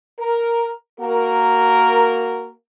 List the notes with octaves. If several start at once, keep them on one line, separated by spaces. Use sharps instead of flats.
A#4
A#3 F#4 A#4